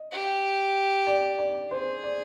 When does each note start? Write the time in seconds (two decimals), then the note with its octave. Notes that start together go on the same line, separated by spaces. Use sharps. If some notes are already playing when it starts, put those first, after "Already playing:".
Already playing: D#5
0.12 G4
1.07 D5
1.38 D5
1.71 G#4 C5
2.03 D5